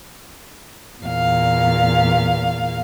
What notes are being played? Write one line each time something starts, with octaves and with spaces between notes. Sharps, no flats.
E2 A#2 F5